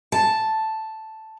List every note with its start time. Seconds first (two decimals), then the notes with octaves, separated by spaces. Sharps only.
0.12 A5